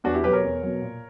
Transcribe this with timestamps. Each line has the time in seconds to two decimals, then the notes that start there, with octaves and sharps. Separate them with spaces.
0.04 E2 D4 F#4
0.14 E4 G4
0.24 B2 F#3 G4 B4
0.33 A#4 C#5
0.44 E2
0.62 B2 F#3
0.82 A#2